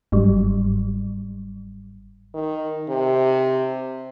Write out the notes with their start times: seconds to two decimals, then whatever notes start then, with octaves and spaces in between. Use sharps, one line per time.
0.12 G1 G#2 F#3 G3
2.34 D#3
2.89 C3